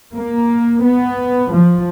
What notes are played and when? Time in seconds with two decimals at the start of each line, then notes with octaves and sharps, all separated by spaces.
0.14 A#3
0.83 B3
1.53 F3